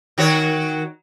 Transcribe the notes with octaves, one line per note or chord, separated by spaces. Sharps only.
D#3 F#4 C#5